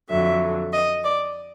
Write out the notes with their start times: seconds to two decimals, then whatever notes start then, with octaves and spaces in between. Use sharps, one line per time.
0.09 F2 D3 F#3 E5
0.72 D#5
1.03 D5